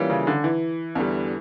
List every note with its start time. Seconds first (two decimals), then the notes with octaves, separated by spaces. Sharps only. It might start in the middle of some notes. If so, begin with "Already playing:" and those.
Already playing: E3 G3 A#3 C#4 F4
0.10 C#3
0.27 D3
0.44 E3
0.95 E2 D3 G3